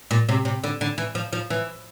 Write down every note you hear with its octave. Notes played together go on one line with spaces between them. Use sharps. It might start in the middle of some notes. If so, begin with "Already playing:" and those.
A#2
C3
C3
D3
D3
E3
F3
F3
E3